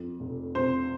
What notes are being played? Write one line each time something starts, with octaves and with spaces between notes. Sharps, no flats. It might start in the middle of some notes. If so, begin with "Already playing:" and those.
Already playing: F2
F1
C3 C5